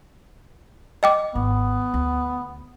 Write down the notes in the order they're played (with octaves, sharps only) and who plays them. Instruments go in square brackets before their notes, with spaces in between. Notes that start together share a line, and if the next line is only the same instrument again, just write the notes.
[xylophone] D#5 G5 D6
[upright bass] G#1 [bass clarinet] B3
[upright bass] D2